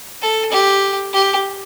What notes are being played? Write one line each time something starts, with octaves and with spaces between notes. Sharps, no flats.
A4
G4
G4